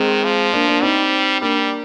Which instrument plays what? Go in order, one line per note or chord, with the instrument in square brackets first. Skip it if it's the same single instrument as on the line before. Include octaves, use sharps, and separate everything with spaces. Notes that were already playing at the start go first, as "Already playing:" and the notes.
Already playing: [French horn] D#3 [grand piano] G#3 C4
[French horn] F3
[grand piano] A#3 D4
A#3 D4
[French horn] G3 [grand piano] C4 D#4
[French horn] G3 [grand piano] A#3 D4